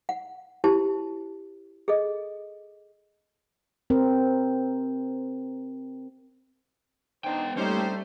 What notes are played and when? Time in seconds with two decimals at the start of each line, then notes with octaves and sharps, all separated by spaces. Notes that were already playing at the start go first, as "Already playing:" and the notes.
0.09 F#5
0.64 E4 F#4 G4 C5 A5
1.88 G#4 A4 D#5
3.90 C4 A#4
7.24 B3 D4 D#4 C5 G5
7.57 G3 A3 A#3 C#4 D#4 G4 C5 A#5